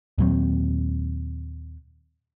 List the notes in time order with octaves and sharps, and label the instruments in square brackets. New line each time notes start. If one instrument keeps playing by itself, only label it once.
[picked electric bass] D#2 A#2 F#3 C4